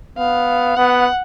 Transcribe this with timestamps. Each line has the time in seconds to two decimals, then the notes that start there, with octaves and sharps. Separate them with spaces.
0.18 B3 F5
0.76 B3 F#5